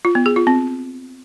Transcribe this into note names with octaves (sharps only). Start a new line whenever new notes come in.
F4
B3
G#4
F4
C4